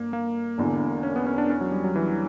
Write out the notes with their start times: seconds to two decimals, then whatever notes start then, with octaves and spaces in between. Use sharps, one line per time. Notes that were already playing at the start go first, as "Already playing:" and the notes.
Already playing: G1 A#3
0.13 A#3
0.58 E1 E2 D3
1.03 C#4
1.16 B3
1.26 C#4
1.38 D4
1.50 C#4
1.61 F#3
1.72 G3
1.84 F#3
1.96 E3